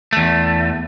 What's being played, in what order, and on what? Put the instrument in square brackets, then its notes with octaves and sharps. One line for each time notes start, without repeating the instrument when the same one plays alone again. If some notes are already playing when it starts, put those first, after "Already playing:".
[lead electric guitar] E2 A3